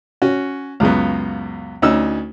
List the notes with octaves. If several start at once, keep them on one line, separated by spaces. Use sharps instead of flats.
C#4 F#4
C#2 F#2 C#3 B3
D2 C#4 D#4 E6